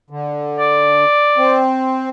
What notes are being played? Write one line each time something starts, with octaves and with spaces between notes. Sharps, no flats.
D3
D5
C4